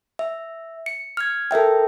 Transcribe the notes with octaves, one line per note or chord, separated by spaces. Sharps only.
E5
C#7
F6 G#6
A4 A#4 E5 G5